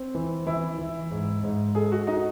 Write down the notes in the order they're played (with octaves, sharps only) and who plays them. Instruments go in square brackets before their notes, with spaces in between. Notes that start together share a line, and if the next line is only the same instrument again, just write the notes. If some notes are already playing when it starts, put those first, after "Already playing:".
Already playing: [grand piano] C4
E3
[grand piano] E3 [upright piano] E4
[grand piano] E3
G#2
G#2
[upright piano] G#4 [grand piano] A4
[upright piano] F#4
[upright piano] D#4 [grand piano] F#4